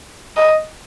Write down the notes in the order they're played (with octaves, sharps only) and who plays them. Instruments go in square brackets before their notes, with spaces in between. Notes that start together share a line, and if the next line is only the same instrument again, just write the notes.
[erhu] D#5